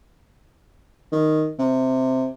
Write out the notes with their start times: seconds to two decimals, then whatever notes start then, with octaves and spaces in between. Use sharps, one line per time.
1.12 D#3
1.59 C3